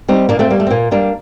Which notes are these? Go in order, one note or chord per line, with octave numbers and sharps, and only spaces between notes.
G3 C4 D#4
A#2 A#3 D4
A3 C4
G3 A#3
A3
C4
A#2 A#3
G3 A#3 D4